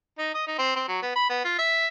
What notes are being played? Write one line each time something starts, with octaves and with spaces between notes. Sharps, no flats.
D#4
D#5
D#4
C4
C4
F#3
B3
B5
B3
F4
E5